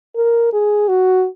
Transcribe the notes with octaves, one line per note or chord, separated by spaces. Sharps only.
A#4
G#4
F#4